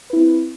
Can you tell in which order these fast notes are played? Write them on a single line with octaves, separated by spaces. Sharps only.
B4 E4 C4